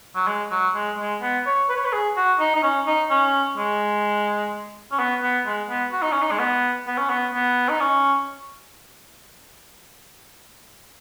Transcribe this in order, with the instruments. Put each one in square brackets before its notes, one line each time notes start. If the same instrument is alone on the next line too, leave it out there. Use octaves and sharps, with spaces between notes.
[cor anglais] F#3
G#3
F#3
G#3
G#3
B3
C#5
B4
C#5
B4
G#4
F#4
D#4
D#4
C#4
D#4
C#4
G#3
C#4
B3
B3
G#3
B3
F#4
D#4
C#4
D#4
G#3
B3
B3
C#4
B3
B3
D#4
C#4